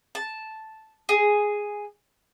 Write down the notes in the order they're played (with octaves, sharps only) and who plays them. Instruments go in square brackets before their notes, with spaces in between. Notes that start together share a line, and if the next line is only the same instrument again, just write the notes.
[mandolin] A5
G#4